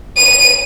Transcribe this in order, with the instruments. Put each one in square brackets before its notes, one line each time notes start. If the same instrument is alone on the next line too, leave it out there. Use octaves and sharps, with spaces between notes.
[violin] D#7